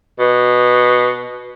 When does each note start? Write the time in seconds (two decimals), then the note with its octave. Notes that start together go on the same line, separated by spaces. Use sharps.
0.20 B2